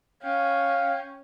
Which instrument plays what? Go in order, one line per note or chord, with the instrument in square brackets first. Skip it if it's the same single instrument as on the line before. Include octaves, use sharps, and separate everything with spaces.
[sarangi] C#4 [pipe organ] F5 G5